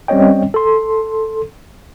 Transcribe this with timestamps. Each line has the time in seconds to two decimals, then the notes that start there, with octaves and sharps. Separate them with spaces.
0.08 G3 C4 C#4 C#5 D#5 G5
0.54 A4 C6